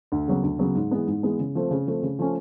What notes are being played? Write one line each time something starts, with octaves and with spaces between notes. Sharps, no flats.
D2
C#3 F#3 B3
D2
C#3 F#3 B3
G#2
E3 G#3 B3
G#2
E3 G#3 B3
C#3
F3 A3 C4
C#3
F3 A3 C4
C#3
F3 A3 C#4